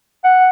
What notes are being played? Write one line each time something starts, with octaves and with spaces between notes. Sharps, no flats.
F#5